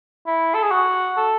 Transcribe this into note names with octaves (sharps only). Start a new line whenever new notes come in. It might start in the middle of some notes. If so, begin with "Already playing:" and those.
E4
A4
G#4
F#4
A4